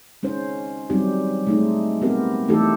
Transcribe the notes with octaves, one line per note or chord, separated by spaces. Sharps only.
G#3 C#4 D#4 C5
F#3 G3 C4 D#4 G4
G#3 A3 D#4
B3 C4 G4 A#4
E3 A3 D#4 E4 G4 A4